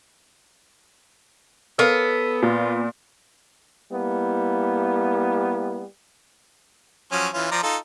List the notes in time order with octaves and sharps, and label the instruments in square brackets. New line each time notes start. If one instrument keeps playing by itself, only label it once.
[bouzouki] B3 [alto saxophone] A4 [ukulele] A#4 C#5 F5
[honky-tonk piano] A#2 [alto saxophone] F4
[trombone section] G3 A#3 B3 E4
[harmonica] F3 F#3 C#4
E3 C#4 F4
F3 D5 A#5
D#4 F4 A4